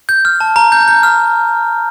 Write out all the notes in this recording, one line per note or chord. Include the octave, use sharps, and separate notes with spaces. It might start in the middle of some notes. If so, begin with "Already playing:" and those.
G6
F6
A5
A#5
G6
G6
F6